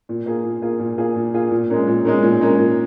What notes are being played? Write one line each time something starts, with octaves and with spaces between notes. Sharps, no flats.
A#2
A#3 F4 G#4
A#2
A#3 F4 G#4
A#2
A#3 F4 G#4
A#2
A#3 F4 G#4
A#2
G#3 C#4 A#4
A#2
G#3 C#4 A#4
A#2
G#3 C#4 A#4
A#2